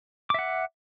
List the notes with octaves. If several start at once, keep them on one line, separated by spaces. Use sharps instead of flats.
E5 F#5 D6